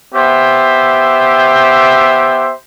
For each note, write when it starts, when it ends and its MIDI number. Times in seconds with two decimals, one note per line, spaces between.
0.14 2.53 59
0.14 2.53 67
0.14 2.53 72
0.14 2.53 76